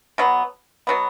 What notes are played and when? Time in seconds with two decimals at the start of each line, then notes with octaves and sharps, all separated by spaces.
0.18 B2 F#3 B3
0.87 B2 F#3 B3